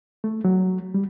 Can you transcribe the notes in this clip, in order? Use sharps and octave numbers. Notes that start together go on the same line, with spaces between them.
A3
F#3
G3